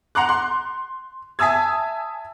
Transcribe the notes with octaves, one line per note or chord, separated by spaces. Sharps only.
F#5 A#5 C6 D6 F#6
C6
E5 G#5 A5 D#6 E6 G#6